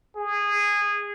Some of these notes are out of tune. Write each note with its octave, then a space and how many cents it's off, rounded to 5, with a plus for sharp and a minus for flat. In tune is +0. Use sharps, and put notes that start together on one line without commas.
G#4 -20